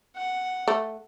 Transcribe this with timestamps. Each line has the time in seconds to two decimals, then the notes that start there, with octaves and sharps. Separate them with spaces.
0.17 F#5
0.68 A3